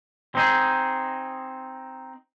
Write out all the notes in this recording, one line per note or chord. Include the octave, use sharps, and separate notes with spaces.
C4 D#4 G#4